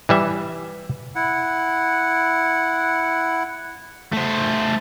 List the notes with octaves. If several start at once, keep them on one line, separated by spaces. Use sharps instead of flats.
E3 G3 E5
E4 F#5
A3 C5